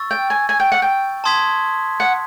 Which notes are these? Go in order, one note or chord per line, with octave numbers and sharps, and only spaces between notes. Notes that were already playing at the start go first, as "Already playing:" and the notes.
Already playing: C#6 E6 A6
G5
G#5
G#5
G5
F#5
G5
A5 C6 D#6 G#6 B6
F#5